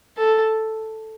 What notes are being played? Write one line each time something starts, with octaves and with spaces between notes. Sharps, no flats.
A4